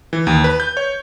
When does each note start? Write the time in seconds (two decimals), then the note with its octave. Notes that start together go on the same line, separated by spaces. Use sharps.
0.13 E3
0.27 D#2
0.44 B4
0.60 G6
0.77 C#5